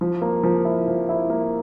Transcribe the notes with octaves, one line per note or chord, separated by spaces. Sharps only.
F3
A#3
F3
E4
F3
E4
A#3